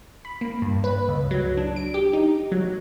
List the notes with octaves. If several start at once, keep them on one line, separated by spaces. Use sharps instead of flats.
B5
A#3
G2
B4
C#2
F#3
D4
D7
G4
D#4
F#3